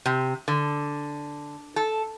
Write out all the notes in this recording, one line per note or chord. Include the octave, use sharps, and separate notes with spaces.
C3
D3
A4